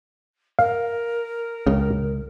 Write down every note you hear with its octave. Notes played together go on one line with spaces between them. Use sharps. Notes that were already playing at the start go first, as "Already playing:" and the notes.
A#4 F5
C#2 C#3